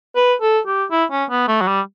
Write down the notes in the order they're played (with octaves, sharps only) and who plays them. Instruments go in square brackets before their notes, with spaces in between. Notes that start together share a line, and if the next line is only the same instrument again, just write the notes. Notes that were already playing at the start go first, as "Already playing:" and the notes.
[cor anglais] B4
A4
G4
E4
C#4
B3
A3
F#3
G3